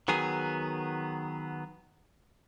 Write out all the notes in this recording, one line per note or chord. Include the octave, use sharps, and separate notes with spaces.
D#3 F#3 B3 G#4